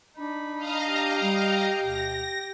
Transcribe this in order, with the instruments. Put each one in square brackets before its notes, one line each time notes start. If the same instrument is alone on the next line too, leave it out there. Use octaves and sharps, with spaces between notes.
[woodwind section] D4 [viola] D#4 B5
[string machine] D#5 F5 A#5
[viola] G4 G5
[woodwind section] G3
[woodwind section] D2 B2 [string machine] A#6